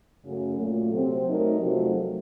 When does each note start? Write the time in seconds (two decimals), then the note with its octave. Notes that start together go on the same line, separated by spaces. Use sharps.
0.25 F#2 C#3 F#3 A3 C#4
0.59 A#2 F#3 A3
0.93 C3 F#3 C4
1.27 F#3 A3 D#4 A#4
1.61 F2 C3 F#3 A3 C4